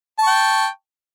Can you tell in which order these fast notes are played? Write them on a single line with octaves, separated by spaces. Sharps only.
A5 C#6 G5